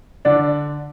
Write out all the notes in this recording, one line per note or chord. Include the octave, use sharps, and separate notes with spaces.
D3 D4 D5